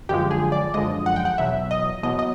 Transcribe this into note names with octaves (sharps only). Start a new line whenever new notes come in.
F#2 D3 F3 G#3 G4
G#4
D5
F#2 D3 F3 G#3 D#5
F#5
G5
F#5
E2 B2 F#3 E5
D#5
E2 B2 F#3 D#5
D#5